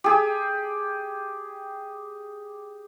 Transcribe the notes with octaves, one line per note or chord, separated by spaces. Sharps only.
G4 G#4